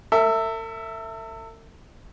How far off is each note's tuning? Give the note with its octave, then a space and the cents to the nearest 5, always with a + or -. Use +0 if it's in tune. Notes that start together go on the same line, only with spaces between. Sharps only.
A4 +45 E5 +0